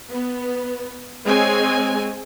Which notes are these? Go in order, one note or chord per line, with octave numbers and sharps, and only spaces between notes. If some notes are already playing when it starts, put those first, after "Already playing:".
B3
G#3 C4 C#5 G#5